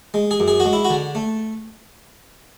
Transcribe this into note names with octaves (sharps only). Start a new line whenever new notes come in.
G#3
G#4
F#2
G#4
G#3 F#4
E4
F#4
D3
A3